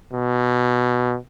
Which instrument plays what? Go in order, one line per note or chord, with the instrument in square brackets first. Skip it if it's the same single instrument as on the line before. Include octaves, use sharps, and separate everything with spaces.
[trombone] B2